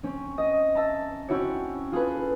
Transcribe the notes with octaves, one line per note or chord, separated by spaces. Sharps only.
C4 C#4
D#5
E5 A5 A#5
C4 C#4 E4 F#4 C#5
F4 G#4 A4 B4